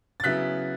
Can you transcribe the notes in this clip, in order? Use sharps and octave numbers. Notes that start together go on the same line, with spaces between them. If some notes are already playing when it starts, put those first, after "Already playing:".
A6
C#3 F#3 B3 E4 F#6 B6